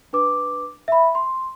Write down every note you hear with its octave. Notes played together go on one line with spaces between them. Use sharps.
D4 B4 D6
E5 B5
C6